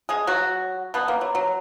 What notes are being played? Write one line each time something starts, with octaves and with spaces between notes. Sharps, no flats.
G#3 G#4
F#3 F#4
B2 B3
A#3
F#3
F#3